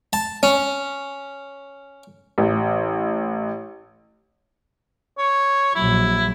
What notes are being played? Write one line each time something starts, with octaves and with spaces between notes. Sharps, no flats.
A5
C#4
A1
C#5
A#1 F#3 E4